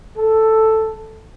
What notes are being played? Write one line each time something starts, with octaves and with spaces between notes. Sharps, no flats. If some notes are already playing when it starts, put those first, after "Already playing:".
A4